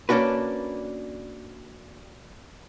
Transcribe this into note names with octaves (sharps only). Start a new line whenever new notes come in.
A#3 C#4 D4 F#4 B4